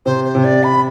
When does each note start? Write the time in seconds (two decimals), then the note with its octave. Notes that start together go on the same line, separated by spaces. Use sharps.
0.06 C3 C5
0.25 C5
0.35 C3
0.44 D5
0.64 B5